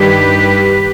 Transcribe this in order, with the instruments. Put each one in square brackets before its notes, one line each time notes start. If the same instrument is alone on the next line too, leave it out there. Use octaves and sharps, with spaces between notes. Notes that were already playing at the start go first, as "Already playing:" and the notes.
Already playing: [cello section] G2 D#3 G3 G4 B4